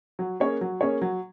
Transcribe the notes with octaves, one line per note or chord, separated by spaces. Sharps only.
F#3
A#3 C#4 G#4 C#5
F#3
A#3 C#4 G#4 C#5
F#3